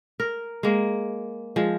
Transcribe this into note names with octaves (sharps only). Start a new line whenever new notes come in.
A#4
G#3 A#3
F3 G#3